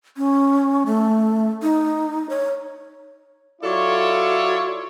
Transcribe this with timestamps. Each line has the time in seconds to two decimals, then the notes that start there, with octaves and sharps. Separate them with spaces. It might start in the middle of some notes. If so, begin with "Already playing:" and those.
0.17 C#4
0.86 A3
1.62 D#4
2.30 C#5
3.61 F#3 E4 F4 A4 C#5 D5